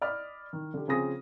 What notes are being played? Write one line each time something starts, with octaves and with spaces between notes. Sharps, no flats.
D5 D#5 B5 F6
D#3
D3 G4
C#3 F3 C4 G#4 D#6 A#6